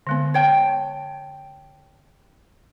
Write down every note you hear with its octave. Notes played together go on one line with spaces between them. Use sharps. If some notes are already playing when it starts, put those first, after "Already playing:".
D3 G#3 B3
C#5 G5 A5